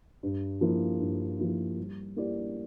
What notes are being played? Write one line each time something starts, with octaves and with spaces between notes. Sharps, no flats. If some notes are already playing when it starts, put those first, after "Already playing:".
G2
F3 A#3 E4
G2
F3 A#3 E4
G3
A#3 E4 G4 D5